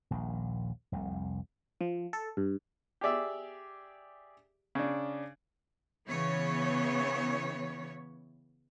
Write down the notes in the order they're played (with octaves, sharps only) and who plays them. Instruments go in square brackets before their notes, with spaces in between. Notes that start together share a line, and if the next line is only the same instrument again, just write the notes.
[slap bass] D#1 A#1
F1 C2
[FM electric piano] F3
A4
G2
[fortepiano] G4 G#4 D5 E5
C#3 D4
[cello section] C#3 E3 B3 C#5